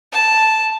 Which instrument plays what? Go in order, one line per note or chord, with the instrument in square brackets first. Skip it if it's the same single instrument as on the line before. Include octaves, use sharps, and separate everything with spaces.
[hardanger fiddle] A5